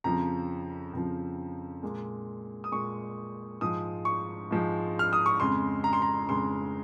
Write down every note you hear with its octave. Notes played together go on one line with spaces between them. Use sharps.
F2 C#3 F3 A#5
F2 C#3 F3
A#2 G#3
D#6
A#2 G#3 C#6
G#2 F3 G#3 D#6
C#6
G#2 F3 G#3
F6
D#6
C#6
F2 C#3 G#3 C6
A#5
C6
A#5
F2 C#3 G#3 C6